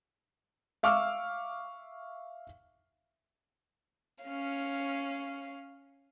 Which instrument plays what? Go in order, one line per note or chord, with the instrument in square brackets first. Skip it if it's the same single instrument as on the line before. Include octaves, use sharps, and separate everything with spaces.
[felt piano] E5 F5 C#6 D6 E6 F6
[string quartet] C#4 C#5 F5